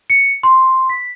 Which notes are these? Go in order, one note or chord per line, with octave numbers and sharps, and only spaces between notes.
C#7
C6
B6